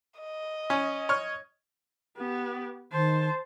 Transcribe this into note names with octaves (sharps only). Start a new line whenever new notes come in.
D#5
C#4
C#5 F6
B3 G4
D#3 C5 A5